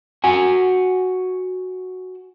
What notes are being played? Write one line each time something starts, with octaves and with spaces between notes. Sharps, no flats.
F#4 F#5 G#5